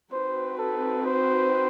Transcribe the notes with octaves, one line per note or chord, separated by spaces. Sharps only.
C4 D#4 F#4 B4 C5
A4
C5